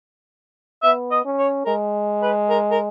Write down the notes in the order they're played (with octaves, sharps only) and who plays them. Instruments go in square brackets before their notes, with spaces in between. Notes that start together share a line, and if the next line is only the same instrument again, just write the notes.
[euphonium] B3 [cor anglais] E5
[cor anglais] D#5
[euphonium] C#4
[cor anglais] C#5
[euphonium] G#3 [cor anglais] A#4
[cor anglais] B4
A#4
A#4